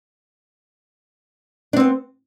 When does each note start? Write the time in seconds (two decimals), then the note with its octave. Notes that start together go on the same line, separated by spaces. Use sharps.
1.73 D4
1.76 C4
1.80 B3